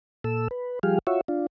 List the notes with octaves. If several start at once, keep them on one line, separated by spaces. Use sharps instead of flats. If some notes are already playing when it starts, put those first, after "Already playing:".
A#2 A4 E6
B4
F3 G3 G4 G#4 F5
F4 F#4 C#5 E5
D4 F4